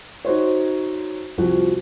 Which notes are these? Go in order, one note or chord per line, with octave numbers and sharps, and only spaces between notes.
D#4 F#4 C5 C#5
C2 F3 F#4